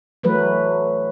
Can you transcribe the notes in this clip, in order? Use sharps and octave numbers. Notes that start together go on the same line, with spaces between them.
E3 F#3 A3 B4